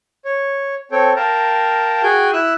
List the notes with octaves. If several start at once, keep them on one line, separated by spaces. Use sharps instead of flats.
C#5
C4 A4 C#5 G5
A#4 F5 G5 A5 A#5
F#4 G#4 G5 G#5 G6
E4 E6 F#6